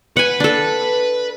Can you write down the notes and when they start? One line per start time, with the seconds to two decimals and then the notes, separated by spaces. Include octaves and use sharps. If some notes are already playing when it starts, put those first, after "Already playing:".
0.17 B4 F#5 G#5
0.40 D4 A4